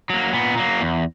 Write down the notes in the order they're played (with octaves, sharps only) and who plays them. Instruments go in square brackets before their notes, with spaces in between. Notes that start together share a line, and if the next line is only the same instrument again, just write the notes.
[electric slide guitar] F#3 A#3
A#2 B3
F#3 A#3
E2